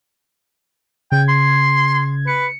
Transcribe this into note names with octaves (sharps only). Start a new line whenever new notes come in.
C#3 G5 G#6
C6
B4 C#7